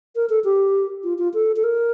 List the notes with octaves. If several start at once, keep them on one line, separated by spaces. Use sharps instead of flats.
A#4
A4
G4
F4
F4
A4
A4
A#4